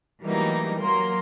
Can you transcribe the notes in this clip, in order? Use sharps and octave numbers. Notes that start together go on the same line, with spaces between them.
E3 F#3 G3 A3 A#3 D#4
F#3 A#3 A#4 C6